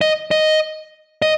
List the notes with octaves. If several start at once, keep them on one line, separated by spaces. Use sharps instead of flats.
D#5
D#5
D#5